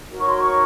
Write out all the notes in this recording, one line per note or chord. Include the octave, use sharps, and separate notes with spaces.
D#4 F#4 A#4 C#5
C#6
C6
C#6